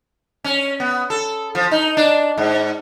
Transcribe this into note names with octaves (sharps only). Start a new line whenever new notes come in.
C#4
B3
A4
F3
D#4
D4
G#2